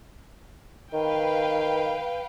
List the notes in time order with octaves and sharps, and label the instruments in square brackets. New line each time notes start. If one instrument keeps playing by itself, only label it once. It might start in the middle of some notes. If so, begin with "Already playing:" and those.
[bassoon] D#3 [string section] B4 F5 G5